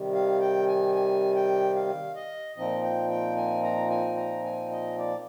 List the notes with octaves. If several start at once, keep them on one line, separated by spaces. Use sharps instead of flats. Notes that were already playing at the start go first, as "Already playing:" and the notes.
Already playing: C3 D#3 G3
F5
G5
G#5
G#5
G5
F5
D#5
A#2 F3 C4 D#4 D#5
G5
G5
G#5
A#5
G#5
A#5
G#5
D#5
D5